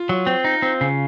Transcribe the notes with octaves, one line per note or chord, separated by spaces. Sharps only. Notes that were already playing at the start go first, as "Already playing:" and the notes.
Already playing: F4
F#3
C4
D#4
C4
C#3